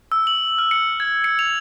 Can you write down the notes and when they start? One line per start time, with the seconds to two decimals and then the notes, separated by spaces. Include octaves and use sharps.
0.12 E6
0.27 F#7
0.58 F6
0.71 C#7
1.00 G#6
1.24 C#7
1.39 F7